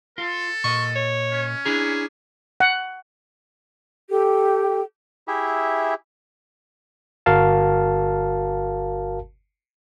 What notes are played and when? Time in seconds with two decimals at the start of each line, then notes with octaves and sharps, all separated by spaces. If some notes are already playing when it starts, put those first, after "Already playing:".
0.18 F4 A4
0.64 A#2 D#5 C#6
0.96 C#5
1.32 C#4
1.66 D4 E4 G#4 A#5
2.60 F#5
4.10 G4 A4 G5
5.28 E4 G4 G#4 E5
7.26 G1 F#4 A#4 F5 A5